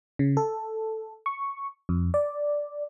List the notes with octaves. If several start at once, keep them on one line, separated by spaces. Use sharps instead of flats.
C#3
A4
C#6
F2
D5